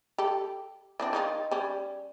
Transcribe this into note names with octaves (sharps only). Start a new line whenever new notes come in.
G4 A4
E3 C4 D4
D#3 D#4 F4
G3 C#4